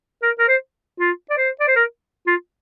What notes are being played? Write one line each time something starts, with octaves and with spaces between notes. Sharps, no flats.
A#4
A#4
C5
F4
D5
C5
D5
C5
A#4
F4